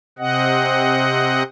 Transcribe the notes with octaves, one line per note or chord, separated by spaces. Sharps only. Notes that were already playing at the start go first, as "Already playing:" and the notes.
C3 C4 D#5 F#5